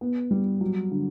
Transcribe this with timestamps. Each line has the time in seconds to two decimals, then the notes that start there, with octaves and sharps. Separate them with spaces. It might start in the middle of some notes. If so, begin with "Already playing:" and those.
0.01 B3
0.31 G3
0.61 F#3
0.91 D3